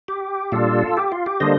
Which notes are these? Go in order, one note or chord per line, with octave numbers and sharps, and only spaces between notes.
G4
A#2 G3 D4 F4 A4
G4
F4
G4
D3 G3 A#3 D4 C5 D#5